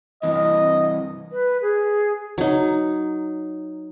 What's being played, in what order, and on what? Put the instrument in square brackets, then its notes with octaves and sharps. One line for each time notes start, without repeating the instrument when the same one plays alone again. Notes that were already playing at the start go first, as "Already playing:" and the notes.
[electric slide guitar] G2 C3 E3 [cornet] D#5
[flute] B4
G#4
[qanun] F#3 D#4